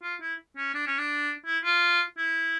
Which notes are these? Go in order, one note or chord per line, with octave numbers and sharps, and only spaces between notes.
F4
E4
C#4
D4
C#4
D4
E4
F4
E4